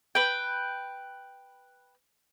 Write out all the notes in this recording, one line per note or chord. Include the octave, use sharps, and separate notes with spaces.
B4 G5